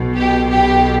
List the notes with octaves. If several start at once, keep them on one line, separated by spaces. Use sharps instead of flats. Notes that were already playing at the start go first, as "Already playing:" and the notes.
Already playing: B1 B2
G4
G4